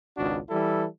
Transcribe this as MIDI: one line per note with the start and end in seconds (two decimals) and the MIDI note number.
0.16 0.38 32
0.16 0.38 37
0.16 0.38 62
0.16 0.38 66
0.49 0.84 52
0.49 0.84 55
0.49 0.84 64
0.49 0.84 69